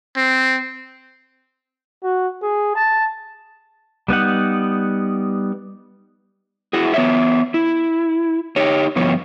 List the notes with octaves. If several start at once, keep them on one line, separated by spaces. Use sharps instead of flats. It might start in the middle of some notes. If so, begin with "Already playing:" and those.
C4
F#4
G#4
A5
G3 B3 D#4 F#5
E4 F#4 G#4
B3 C#5 E5
E4
D#4 G4 C#5
G2 D3 F3 B3 C#5